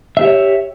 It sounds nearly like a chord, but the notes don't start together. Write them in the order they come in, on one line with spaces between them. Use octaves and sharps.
E5 G4 C#5